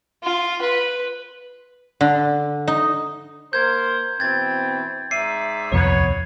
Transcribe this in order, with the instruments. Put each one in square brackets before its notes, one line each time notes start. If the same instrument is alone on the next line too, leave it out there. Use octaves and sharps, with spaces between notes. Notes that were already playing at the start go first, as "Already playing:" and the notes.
[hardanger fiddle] F4
B4
[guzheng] D3
D#4
[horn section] A#3 A#4 C5 [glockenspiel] G6 G#6
[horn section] B2 E3 C4 [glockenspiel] G#6 A6
[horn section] G#2 D5 E5 [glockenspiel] C7 D#7
[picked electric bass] D#1 C2 F2 [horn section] B3 C#5